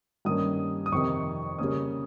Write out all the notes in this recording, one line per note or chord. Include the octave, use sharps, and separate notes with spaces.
G2 D#3 A#3 C#4 D#6
D#6
F2 C3 D#3 C#6
C#3 G3 A#3 C#4 D#6